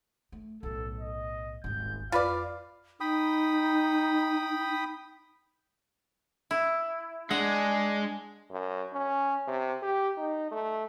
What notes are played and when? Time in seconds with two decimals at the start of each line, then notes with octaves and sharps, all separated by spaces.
0.32 A3
0.63 B1 A2 A4
1.00 D#5
1.64 D#1 G#1 G6
2.12 F2 F4 B4 D5 F5
3.00 D#4 G5 B5 D#6
6.51 E4
7.31 G#3 D4 F#5
8.51 F#2
8.93 C#4
9.48 C3
9.82 G4
10.18 D#4
10.51 A3